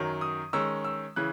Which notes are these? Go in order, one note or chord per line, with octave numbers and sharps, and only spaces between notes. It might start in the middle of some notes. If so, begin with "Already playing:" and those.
Already playing: F#2 D#3 F#3
D#6
D#3 G#3 C#4 E6
E6
C#3 E3 F#6